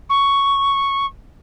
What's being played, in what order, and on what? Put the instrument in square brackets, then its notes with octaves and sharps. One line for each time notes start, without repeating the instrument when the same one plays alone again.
[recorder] C#6